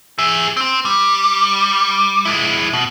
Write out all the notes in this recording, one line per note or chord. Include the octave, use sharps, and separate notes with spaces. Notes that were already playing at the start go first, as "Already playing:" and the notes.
G#4 E5
C4 C5
G3
G#3 E4
B2